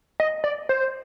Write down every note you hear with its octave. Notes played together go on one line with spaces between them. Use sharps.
D#5
D5
C5